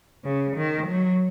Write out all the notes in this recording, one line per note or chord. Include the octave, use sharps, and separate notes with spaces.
C#3
D#3
F#3